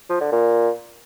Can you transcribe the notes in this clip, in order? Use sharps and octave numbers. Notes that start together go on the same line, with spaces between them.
F3
D3
A#2